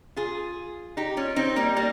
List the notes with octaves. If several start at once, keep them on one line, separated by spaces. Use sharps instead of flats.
F4 G#4
D#4 G4
C#4 F4
C4 D#4
G3 A#3
G3 A#3